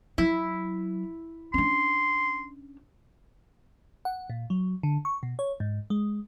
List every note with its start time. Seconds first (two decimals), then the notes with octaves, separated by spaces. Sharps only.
0.18 F#3 E4
1.54 C#4 D4 C6
4.05 F#5
4.30 A#2
4.50 F#3
4.83 D3
5.05 C#6
5.23 B2
5.39 C#5
5.60 G#2
5.90 G#3